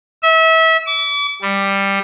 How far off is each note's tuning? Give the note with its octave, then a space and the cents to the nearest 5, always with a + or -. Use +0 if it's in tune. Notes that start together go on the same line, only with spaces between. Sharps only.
E5 -30
D6 -40
G3 +10